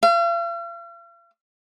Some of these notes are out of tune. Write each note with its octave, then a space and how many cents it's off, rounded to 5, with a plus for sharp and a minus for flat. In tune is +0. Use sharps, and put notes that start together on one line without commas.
F5 -45